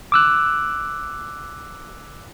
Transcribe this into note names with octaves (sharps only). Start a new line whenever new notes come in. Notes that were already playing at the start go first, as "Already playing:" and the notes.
D6 E6 F#6